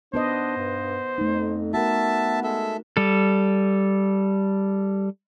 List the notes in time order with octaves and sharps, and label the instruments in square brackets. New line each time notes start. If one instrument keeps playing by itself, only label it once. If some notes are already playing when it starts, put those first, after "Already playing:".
[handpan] B3 B4 D#5 [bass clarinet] D4 [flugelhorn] C5
[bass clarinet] G2
[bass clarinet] F2 [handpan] A3 D#4
[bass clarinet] B3 [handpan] F#4 A#4 [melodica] E5 A5
[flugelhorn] G#3 [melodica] A4 E5
[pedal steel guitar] G3 A4